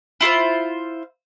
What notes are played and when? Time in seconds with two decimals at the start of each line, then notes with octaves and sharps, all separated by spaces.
0.21 E4 F4 A4 C5